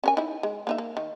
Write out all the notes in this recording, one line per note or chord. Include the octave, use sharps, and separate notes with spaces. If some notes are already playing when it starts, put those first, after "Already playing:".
C#4 A#4 G#5
D#4 E4
G#3
A#3 D#4 E5
A#3
D#3